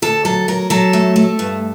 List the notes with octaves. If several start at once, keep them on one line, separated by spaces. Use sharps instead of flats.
D2 A4
F#3 A4
F#3 A#4
F#3 A4
A3
A3
G2